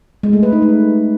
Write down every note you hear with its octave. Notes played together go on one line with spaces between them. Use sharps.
G#3
A3
B4
D#4
A3